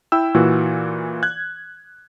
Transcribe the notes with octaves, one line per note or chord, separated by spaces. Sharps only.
E4 G5 E6
A#2 E3 F#4
F#6 G#6